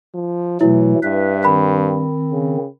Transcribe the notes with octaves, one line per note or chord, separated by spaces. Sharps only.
F3
B2 E3 F#3 A3 E4
G2 B4 E5
D#3 C4 B5
C#3